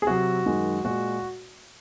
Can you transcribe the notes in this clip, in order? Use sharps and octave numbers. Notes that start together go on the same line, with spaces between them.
G#4
C3 F#3 F#4
F#2 D#3 G#3
A#2 G#3 F#4